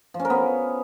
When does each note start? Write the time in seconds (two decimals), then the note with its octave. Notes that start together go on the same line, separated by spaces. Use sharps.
0.14 F3
0.20 C#4
0.25 A#4
0.30 B3